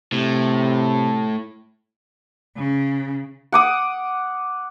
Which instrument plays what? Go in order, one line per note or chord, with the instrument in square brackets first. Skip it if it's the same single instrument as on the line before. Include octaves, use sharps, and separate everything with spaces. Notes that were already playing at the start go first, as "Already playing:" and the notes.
[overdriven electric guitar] A2 [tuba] C3
[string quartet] C#3
[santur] F#5 D6 D#6